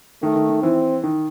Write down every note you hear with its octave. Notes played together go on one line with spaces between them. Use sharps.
D#3 A3
D#3
D#3
E3 C4
D#3